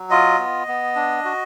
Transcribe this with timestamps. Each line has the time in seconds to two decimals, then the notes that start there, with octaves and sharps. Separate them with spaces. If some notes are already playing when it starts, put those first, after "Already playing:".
Already playing: F#3
0.10 F4 D#5
0.39 B3
0.68 B3
0.96 D4
1.25 F#4